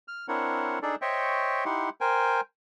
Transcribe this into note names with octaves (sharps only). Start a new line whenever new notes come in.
F6
C4 D4 E4 A#4 C#5 F#5
D4 D#4 G#4 A4 D5
C5 C#5 D#5 E5 G5 C#6
D#4 E4 G4 F#5 C6
A#4 C5 G5 G#5